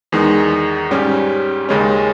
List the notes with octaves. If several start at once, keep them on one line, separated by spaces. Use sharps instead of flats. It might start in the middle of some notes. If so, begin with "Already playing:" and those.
E2 D#3 G#3 D#4
G#2 G3 C#4 G4
D#2 C#3 G#3 C#4